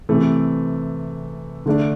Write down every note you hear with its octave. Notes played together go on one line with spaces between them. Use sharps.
C3 E3 A3
D3 A3 D4